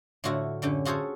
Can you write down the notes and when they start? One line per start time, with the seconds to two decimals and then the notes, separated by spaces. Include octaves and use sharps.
0.24 A2 D3 F4 F#4 E5
0.62 F#2 D3 C#4 G4
0.85 F4 F#4 G#4 A4 C5 C#5